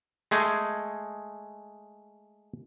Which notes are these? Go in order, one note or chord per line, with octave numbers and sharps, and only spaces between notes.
G#3 A3 G#4